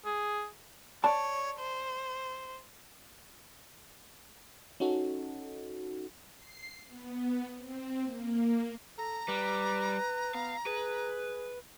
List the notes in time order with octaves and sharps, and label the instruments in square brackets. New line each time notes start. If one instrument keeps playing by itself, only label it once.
[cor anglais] G#4
[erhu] C#5 [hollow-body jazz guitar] D5 A5
[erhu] C5
[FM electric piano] C#4 D#4 F#4 A4
[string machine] C7
B3
C4
A#3
[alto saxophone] A4 [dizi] A#5
[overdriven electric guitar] G3 [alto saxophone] B4
[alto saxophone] B3 [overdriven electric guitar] F5
[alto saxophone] G#4 [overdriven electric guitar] B4